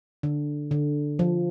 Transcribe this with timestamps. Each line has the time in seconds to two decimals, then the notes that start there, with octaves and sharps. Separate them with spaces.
0.23 D3
0.71 D3
1.19 F3